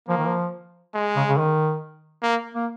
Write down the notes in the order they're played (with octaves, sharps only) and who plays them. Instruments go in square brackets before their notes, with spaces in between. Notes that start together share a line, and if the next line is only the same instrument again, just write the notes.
[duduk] F3 [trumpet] A#3
[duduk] D#3
F3
[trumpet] G#3
[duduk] C#3
C#3
D#3
[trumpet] A#3
[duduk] A#3